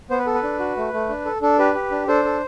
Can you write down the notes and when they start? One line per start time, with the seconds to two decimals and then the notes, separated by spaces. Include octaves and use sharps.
0.10 B3 C5
0.18 B4
0.27 A4
0.35 B4
0.43 D4
0.59 F#4
0.77 A3
0.93 A3
1.09 D4
1.25 A4
1.42 D4 A4
1.59 G4 B4
1.75 G4
1.91 D4
2.07 D4 A4 C5
2.25 A4